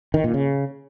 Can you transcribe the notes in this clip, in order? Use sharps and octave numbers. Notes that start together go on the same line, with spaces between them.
D#3
A#2
C#3